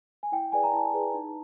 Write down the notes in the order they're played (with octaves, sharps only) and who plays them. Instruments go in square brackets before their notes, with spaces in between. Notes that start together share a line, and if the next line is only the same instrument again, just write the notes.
[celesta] G#5
E4 G5
G#4 B4 D5 G#5
A#5
E4 A5
G#4 B4 D5
D#4